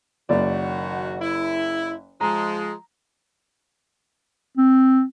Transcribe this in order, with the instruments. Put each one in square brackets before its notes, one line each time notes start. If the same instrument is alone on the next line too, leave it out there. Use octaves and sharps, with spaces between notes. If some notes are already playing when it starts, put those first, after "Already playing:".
[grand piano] F#1 D5 [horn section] D#3 F#4
[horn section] E4
[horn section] F3 G#3 [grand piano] A#5
[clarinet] C4